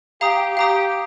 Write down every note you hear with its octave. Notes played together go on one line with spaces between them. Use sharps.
G4 F5 A#5 D#6
G4 F5 A#5 D#6